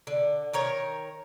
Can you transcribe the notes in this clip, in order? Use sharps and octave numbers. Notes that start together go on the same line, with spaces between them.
D3
D#3 A#4 C#5